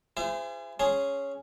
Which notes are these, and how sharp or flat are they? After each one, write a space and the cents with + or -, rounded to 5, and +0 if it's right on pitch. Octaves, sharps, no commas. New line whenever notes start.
E4 +40 G#4 -25 C5 -30
C#4 +0 G#4 +0 C6 +0